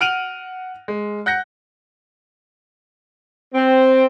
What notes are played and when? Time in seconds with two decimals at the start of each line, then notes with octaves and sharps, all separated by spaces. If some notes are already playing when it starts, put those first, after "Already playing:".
0.01 F#5 F6 D7 D#7 F7 F#7
0.88 G#3
1.26 F#5 F#6 G6 A#6 C#7
3.54 C4